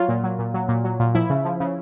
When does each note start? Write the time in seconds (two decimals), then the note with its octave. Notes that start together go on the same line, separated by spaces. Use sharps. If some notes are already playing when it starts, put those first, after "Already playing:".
Already playing: F#3 F4
0.09 A#2
0.24 F#3
0.39 A#2
0.54 F#3
0.68 A#2
0.84 F#3
1.00 A#2
1.15 F3 E4
1.30 C#3
1.45 F3
1.60 C#3